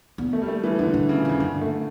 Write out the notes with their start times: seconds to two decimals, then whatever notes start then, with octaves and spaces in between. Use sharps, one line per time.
0.18 E2
0.33 A3
0.42 G3
0.48 A3
0.64 E3
0.79 F2 D3
0.94 A2
1.09 C#3
1.19 A#2
1.25 F2
1.29 C#3
1.40 G2 D3
1.61 A3